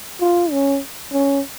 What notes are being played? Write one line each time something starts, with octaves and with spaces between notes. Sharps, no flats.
F4
C#4
C#4